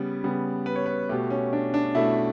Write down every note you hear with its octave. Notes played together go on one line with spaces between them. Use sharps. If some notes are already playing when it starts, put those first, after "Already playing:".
Already playing: C#3 G3 B3
C#3 G3 B3
B4
C#5
B4
B2 A3 G4
C#4
D4
D4
B2 A3 E4